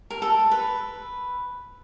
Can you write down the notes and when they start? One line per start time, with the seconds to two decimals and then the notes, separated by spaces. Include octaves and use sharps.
0.10 A#4
0.22 A4
0.51 B4